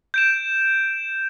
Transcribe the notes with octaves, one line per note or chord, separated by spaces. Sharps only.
G6 D7 E7